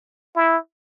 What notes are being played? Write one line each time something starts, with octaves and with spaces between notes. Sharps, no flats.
E4